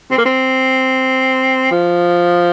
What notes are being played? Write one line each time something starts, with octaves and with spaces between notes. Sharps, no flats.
C4
A#3
C4
F3